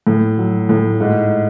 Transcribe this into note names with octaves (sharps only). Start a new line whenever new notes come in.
A2
F#3
A2
G#2